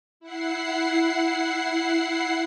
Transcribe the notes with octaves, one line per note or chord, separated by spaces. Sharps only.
E4 F#5 C7